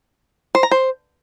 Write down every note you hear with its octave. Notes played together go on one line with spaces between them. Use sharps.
C5
A#5
C5